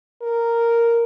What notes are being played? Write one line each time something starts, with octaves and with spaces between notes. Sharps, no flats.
A#4